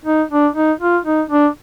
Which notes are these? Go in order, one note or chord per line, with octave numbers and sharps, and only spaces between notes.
D#4
D4
D#4
F4
D#4
D4